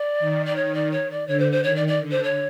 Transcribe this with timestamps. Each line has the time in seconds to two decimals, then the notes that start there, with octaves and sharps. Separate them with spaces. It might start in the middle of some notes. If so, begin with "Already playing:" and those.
Already playing: D5
0.20 D#3
0.45 D5
0.55 C#5
0.74 D5
0.91 C#5
1.10 D5
1.27 D3 C#5
1.39 C5
1.52 C5
1.63 D#3 C#5
1.75 D5
1.87 D5
2.00 D3
2.11 C5
2.23 C#5